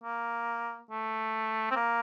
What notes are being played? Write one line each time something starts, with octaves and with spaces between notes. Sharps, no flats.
A#3
A3
C4
A#3